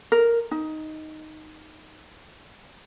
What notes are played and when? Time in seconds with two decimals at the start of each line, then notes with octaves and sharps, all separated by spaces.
0.12 A#4
0.51 D#4